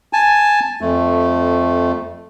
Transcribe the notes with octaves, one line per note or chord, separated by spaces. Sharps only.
G#5 A5
F2 A3